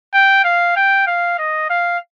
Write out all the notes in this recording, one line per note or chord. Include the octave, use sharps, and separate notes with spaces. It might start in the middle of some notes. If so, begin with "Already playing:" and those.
G5
F5
G5
F5
D#5
F5